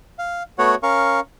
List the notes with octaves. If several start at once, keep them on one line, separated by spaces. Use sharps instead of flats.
F5
A3 B3 F#4 C#5 F#5
C#4 A#4 F5 C#6